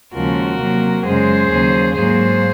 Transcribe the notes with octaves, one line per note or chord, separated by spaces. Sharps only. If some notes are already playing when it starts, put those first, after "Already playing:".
D#2 C#3 F3 G#3 F#4 A#4
C3 F#3 A#3
F#2 C#3 G#3 G#4 C5
D#2 C#3 F#3
G#2 F#3 A#3 G#4 C5